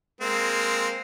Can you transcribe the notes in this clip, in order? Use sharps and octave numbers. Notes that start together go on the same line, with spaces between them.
G#3 A#3 C4